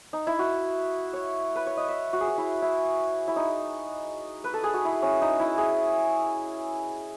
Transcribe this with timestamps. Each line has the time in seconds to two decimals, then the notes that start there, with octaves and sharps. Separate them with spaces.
0.13 D#4
0.27 E4
0.39 F#4
1.13 C#5
1.56 B4
1.67 C#5
1.77 D#5
1.88 E5
2.13 F#4
2.21 G#4
2.27 F#4
2.38 E4
2.62 E4
3.28 E4
3.36 D#4
4.44 B4
4.54 A4
4.64 G#4
4.74 F#4
4.85 E4
5.02 C#4
5.21 D#4
5.40 E4
5.58 G#4